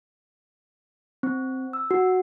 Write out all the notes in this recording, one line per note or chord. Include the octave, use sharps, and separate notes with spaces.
C4
E6
F#4